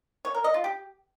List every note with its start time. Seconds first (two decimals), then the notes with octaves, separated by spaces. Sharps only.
0.25 C#5
0.34 A#4
0.44 D#5
0.54 F4
0.64 G4